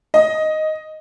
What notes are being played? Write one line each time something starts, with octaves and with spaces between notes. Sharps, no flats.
D#5